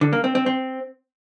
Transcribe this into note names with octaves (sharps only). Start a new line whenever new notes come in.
D3
A#3
C4
C4
C4